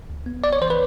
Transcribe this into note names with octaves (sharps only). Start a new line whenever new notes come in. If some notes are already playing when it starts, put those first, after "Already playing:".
D2
B3
G#1 D5
C#5
E3 C5
B4